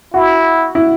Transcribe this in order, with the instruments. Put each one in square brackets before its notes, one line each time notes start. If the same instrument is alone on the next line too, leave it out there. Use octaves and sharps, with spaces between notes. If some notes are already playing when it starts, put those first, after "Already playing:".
[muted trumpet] E4 [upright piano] F#4
[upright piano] E4